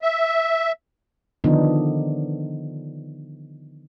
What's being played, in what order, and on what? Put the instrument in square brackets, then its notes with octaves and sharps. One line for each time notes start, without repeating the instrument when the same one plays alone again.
[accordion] E5
[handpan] D3 D#3 F3 B3 D4 D#4